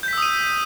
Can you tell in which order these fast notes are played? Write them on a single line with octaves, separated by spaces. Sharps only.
G6 B6 E6 D#6 D#7